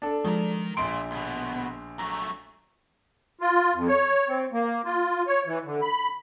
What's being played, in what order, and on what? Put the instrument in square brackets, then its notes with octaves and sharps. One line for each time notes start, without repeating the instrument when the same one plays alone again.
[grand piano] D4 A4
[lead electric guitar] D#3 A#4 [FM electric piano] F3 G#3
[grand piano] A#1 D7 [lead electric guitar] A#2 [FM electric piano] C6
[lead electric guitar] D2 B2
[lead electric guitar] F#3 A3 [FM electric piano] A#5
[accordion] F4
F2
C#5
C4
A#3
F4
C#5
E3
D3
B5